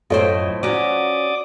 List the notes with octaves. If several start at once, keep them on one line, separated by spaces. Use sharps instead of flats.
F#2 A2 C4 F4 A4 C5 C#5 D#5
F#3 C#4 F#4 D5 D6 D#6